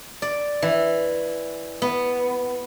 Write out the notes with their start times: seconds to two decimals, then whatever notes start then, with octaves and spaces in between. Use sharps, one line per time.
0.22 D5
0.62 E3
1.82 B3